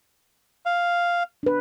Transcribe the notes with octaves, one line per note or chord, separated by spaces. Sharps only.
F5
D4 B4